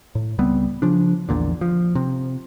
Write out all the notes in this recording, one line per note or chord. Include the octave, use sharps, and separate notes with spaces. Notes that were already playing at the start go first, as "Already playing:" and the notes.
A2
C#2 G3 B3 C4
C#3 F3 D4
A#1 E2 A#2 D3
F3
C3